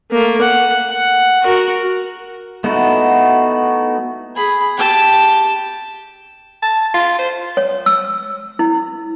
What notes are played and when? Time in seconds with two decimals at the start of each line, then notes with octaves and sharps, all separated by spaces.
0.11 A3 A#3
0.41 F#5
0.90 F#5
1.43 F#4 A#4
2.64 A3 B3 D#4 E4 F#4
4.35 G#4 B5
4.77 G4 A5
6.62 A5
6.94 F4
7.19 C5
7.57 C#5
7.86 E6
8.59 E4